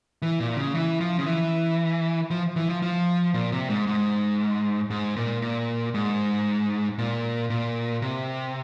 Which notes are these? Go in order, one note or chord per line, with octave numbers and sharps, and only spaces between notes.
E3
A#2
C#3
E3
F3
C#3
E3
F3
E3
F3
F3
A#2
C3
G#2
G#2
G#2
A#2
A#2
G#2
A#2
A#2
C3